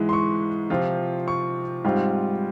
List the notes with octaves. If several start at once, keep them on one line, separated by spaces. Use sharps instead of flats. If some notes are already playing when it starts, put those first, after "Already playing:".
Already playing: G#2 E3 G#3
C6
C#6
C3 F3 C4 F4
C#6
G#2 G3 C4 F4